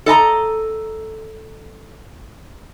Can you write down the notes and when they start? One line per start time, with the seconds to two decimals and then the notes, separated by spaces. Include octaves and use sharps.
0.06 A4 D#5 A5 A#5